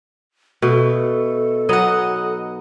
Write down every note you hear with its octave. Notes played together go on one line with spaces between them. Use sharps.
B2 A3 A4
F#3 B3 D#4 D#5 F#5